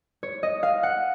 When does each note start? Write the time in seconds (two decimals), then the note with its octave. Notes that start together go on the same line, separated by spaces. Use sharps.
0.23 C#5
0.43 D#5
0.63 F5
0.83 F#5